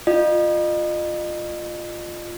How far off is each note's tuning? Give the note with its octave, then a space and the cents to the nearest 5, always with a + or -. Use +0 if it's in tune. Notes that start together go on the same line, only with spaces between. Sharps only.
F4 +0 D#5 -35